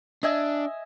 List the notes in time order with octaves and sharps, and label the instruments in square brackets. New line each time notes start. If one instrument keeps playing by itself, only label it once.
[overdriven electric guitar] D4 [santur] D#5 E5 G#5